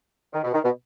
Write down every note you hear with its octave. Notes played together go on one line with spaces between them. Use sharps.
D#3
B2
D#3
B2